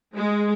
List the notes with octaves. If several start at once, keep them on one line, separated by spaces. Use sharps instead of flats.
G#3